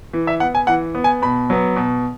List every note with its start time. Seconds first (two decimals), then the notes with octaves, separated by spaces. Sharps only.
0.13 E3
0.27 E5
0.40 B3 F#5
0.55 G#5
0.67 E3 F#5
0.95 B3
1.04 G#5
1.22 B2 B5
1.50 F#3 B3
1.76 B2